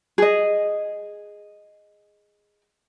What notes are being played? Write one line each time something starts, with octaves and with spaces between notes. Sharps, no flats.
G#4 D#5